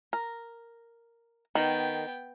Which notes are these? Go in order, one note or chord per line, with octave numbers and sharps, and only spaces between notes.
A#4
D#3 B3 G5